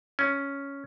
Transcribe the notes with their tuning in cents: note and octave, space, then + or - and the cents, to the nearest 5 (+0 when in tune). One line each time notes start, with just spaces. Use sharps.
C#4 +5